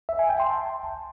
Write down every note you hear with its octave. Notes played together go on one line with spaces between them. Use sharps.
E5
G#5
G5
C6
A5